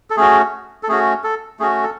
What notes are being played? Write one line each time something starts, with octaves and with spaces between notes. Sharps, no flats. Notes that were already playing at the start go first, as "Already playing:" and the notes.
A4
A3 C#4 F#4 G#4
A4
A3 C#4 F#4 G#4
A4
A3 C#4 F#4 G#4
A4